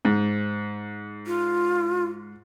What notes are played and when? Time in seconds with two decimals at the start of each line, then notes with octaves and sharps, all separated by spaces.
0.05 G#2
1.26 F4